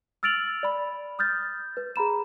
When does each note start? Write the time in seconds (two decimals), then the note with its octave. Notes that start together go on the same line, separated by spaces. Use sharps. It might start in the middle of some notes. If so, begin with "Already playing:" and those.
0.23 E6 F6 A6 D7 F7 F#7
0.63 D5 B5
1.19 D#6 F6 G6 A6
1.77 B4
1.96 G#4 A#5 B5 E7